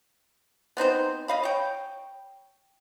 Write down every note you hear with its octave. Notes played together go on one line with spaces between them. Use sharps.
B3 C4 D#4 C5
D#5 F5 B5
C#5 G5